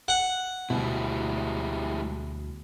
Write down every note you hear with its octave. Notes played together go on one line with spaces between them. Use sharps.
F#5
D2 B2 G3 G#3 E4